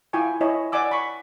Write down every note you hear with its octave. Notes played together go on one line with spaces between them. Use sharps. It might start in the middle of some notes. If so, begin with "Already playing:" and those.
E4 F4 G5 G#5 C#6
E4 C#5 D#5 G#5
D5 F#5 G#5 D6 E6
B5 C#6